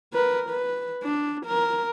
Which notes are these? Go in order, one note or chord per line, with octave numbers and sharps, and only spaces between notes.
A#4 B4
B4
D4
A#4